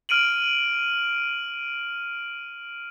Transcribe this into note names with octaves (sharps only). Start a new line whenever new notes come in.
F6 D7 D#7 F#7